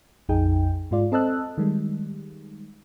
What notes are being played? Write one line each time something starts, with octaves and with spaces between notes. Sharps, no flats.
A#1 F2 D#4 G#4 G5
G#2 G#3 F4 D5
C4 A4 D#5 A5 E6 F#6
D#3 G3 G#3